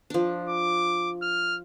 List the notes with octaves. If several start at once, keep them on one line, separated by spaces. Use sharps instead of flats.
F3 D4
D6
F6